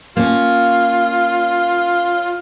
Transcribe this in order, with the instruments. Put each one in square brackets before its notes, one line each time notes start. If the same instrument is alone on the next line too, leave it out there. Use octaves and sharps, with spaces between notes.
[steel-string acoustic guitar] A#3 C#4 [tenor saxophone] F4